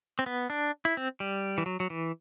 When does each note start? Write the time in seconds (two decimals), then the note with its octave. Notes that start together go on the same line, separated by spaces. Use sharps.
0.19 C4
0.26 B3
0.50 D4
0.85 E4
0.97 C4
1.20 G3
1.58 E3
1.66 F#3
1.80 F#3
1.90 E3